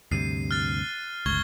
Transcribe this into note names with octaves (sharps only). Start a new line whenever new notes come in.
D2 G2 C3 C7 D#7
F6 F#6 A6
G1 C#2 C#6 G#6 G7